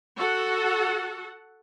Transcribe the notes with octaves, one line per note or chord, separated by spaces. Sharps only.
F#4 A4 F#5